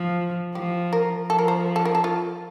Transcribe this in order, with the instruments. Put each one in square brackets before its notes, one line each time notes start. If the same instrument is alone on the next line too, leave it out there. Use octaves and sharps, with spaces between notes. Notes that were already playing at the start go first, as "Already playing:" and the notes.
Already playing: [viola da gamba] F3
[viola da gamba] F3 [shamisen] G4
[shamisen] A#4
[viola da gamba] F3 [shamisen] A4
[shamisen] A#4
C5
A4
A#4
A4
F4